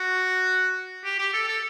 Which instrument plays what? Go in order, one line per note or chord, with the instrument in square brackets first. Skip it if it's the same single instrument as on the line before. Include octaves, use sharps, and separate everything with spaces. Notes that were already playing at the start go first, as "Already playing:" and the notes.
Already playing: [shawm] F#4
G4
G4
A4
A4